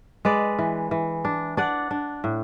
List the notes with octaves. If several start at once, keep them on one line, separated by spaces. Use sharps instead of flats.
G#3 B4 D5
E3
E3
D4
D4 D5 F#5
D4
A2